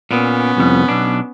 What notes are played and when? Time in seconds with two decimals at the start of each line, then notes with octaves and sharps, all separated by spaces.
0.11 A#2 B3 C#4
0.57 C2 F2
0.88 B1 D4